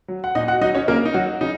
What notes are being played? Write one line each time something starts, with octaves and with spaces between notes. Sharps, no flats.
F#3
F#5
A#2 D#4 D#5
F#4 F#5
F#3 D#4 D#5
C#4 C#5
C#3 A#3 A#4
D#4
F#3 F#4
C#3 D#4